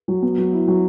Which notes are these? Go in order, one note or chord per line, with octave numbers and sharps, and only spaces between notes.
F#3
B3
F#3
E4
F#3